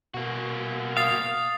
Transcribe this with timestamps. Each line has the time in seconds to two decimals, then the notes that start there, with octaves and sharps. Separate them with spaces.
0.14 B2 A#3 F#4
0.97 F5 D#6 A6 C7